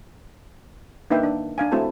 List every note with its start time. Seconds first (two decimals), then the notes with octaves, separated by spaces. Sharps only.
1.10 A#3 D4 D#4 B4 E5 G5
1.23 D4
1.58 D4 F5 G#5
1.72 A3 C4 E4 F#4 A4 A5